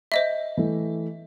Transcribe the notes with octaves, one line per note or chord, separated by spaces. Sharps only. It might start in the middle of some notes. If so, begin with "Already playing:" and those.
C5 D#5 E5
E3 A3